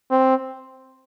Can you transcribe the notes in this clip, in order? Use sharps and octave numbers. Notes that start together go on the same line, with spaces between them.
C4